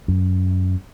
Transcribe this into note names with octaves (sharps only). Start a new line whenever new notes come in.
F#2